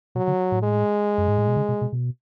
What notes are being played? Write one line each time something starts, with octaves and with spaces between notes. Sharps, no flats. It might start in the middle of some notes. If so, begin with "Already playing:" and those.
B2 F#3
D3
A2
G#3
F#2
G#2
A2
B2
C#3
B2
B2
B2